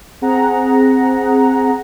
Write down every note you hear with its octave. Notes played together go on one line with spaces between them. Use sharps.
C4 G#4 F#5 A#5